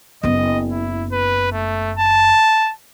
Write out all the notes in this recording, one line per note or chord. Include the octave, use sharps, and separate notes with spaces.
F#1 B3 D#5
E4
B4
A3
A5